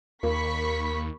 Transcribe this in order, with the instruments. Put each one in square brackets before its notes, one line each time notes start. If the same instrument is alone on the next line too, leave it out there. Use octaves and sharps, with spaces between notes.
[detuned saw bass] D#2 [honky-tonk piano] A#3 [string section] B5 C#6 B6